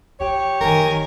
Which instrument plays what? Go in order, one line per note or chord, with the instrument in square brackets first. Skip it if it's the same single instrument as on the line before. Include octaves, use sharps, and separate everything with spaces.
[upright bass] F4 [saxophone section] G4 C#5
[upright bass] F#1 [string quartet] D#3 G#5 [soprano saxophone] A#4